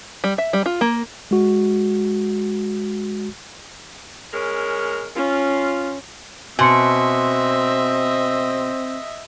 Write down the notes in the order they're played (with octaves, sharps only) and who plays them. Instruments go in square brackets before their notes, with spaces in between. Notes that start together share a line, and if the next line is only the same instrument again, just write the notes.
[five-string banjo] G3
E5
G3
F4
A#3
[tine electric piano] G#3 F#4
[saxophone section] G#3 C#4 A#4
[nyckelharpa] C#4 [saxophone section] F4
[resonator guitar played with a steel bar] B2 [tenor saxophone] C4 [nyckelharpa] D#5 E5 [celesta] G#5 C6 C#7